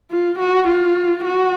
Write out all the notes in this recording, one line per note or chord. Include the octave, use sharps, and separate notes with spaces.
F4
F#4
F4
F#4